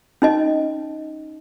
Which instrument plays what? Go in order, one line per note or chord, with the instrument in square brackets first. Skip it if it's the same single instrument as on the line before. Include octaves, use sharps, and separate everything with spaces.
[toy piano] C#4 D#4 D#5